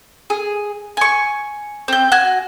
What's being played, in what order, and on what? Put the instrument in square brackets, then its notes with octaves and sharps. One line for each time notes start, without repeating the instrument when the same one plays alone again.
[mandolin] G#4
G#5 C#6
C4 G6
F#4 G#5